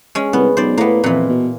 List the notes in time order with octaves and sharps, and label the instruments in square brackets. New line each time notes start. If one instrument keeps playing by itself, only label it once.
[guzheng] G#3 C#4
[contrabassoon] C2 [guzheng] B3
[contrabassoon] B1 [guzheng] C5 D5
[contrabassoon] A2 [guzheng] A#3 B3
[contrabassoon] F2 [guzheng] A#2 E3
[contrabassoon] B2